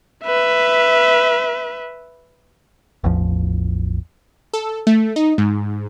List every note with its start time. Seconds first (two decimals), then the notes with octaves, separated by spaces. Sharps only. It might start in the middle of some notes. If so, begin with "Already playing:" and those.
0.24 B4 E5
3.04 A1 E2 F3
4.53 A4
4.87 A3
5.16 D#4
5.38 G#2